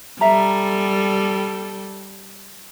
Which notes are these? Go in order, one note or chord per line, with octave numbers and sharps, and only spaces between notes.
G3 A4 E5 A#5